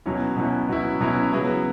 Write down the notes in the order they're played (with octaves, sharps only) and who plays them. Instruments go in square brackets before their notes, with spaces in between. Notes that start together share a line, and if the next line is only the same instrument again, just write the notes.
[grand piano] B2 F#3 C#4 E4
B2 F#3 C#4 E4
B2 F#3 C#4 E4
B2 F#3 C#4 E4
C#3 F#3 B3 E4